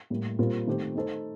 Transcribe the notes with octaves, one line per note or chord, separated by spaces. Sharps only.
A2 G3 A#3
A#2 G3 C4 F4 A#4
D#3 A3 C4 G4 C5
A3 D#4 A4 C5